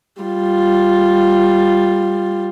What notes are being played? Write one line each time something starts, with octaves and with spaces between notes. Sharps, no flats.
G3 F4